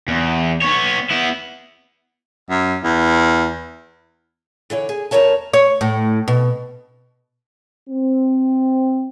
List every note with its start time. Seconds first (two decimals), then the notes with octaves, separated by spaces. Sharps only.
0.08 E2
0.62 B3 C#5
1.11 B3 E4
2.50 F#2
2.83 E2
4.70 D3 E3 C#5 D5
4.89 G#4
5.11 E2 A3 A#4 C#5 A5
5.54 C#5
5.81 A2
6.28 B2
7.90 C4